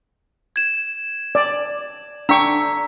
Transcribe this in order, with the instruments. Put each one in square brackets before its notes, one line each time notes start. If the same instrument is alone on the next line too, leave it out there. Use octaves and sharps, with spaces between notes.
[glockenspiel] G#6 E7
[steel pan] D5
[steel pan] D4 G5 C#6 [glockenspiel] A#5 E6 B6